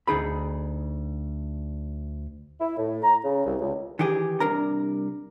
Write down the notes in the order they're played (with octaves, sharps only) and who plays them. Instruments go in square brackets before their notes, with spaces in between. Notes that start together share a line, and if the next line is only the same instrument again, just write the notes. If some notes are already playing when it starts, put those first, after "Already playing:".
[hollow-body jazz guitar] D2 D#4 G#4 B5
[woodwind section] E4
A2
A#5
C#3
C2
C#2
[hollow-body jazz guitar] D#3 E3 G4 G#4
C2 D4 A#4 A#5